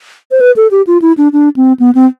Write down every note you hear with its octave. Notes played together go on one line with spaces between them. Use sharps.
C5
B4
A4
G4
F4
E4
D4
D4
C4
B3
C4